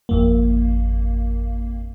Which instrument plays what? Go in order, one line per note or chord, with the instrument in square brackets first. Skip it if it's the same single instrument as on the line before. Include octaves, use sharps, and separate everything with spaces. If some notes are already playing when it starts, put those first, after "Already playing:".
[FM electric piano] G#1 F2 A#3